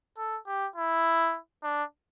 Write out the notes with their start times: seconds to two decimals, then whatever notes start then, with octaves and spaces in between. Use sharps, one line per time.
0.18 A4
0.47 G4
0.76 E4
1.63 D4